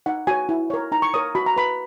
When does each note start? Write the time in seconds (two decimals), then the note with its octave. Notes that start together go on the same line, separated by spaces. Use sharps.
0.06 D#4 F#5
0.27 F#4 C#5 G#5
0.49 E4
0.70 A#4 C#5
0.92 D#4 A#5
1.02 C#6
1.14 A#4 C#5 D#6
1.35 F#4 B5
1.46 A#5
1.57 B4 B5